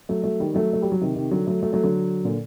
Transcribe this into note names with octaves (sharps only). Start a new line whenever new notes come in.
F#3 A3
F#3 A3
D#3 G3
F#3 A3
A3
G3
F#3
C3 D#3
C3 D#3
D3 F#3
F#3 A3
F#3 A3
F#3 A3
D3 F#3
A#2 D3